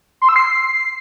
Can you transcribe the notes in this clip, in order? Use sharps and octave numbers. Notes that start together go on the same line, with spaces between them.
C6
E6
C7